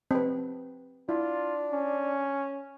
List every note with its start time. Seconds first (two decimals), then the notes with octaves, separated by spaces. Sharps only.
0.11 C4 B4
1.09 D4 E4 F4
1.72 C#4